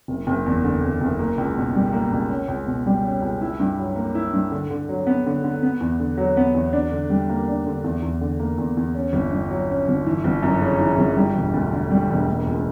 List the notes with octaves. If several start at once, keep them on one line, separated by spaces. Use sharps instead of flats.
F#1
F#1
E2
D3
F#1
F#1
A#3
C#2
B2
G3
A#3
C#2
C#4
C#2
B2
G3
C#4
C#2
E4
G2
F#3
A#3
E4
G2
D3
D3
F#3
B3
D3
D3
B3
E2
D3
F#3
B3
E2
D4
D3
G3
A#3
D4
D3
E2
E2
D3
A#3
E2
E2
C#4
G1
G2
F#3
C#4
G1
E3
G1
F#2
C#3
E3
G1
G3
E1
D2
D3
G3
E1
A#3
C#2